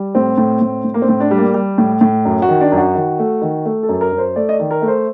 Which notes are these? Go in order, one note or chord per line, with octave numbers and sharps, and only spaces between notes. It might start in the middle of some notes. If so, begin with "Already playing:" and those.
Already playing: G3
A2 C4
A2
A2
A2
A#3
C4
A2
D4
G3
A#3
G3
A2
A2
F#2
F#4
D#3
D4
F#2
F#4
D#3
A3
D#3
A3
A4
F#2
A#4
F#2
C5
A3 D5
D#5
D5
D#3
A#4
A3
C5